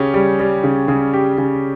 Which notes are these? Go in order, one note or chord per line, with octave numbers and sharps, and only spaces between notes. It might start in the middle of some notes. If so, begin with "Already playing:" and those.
Already playing: C#3 C#4 G4
G3
G3
C#3
C#3
G4
C#3